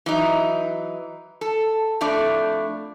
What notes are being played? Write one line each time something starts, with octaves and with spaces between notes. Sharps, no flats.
E3 F#3 D#4
A4
F2 A2 A3 D4 D5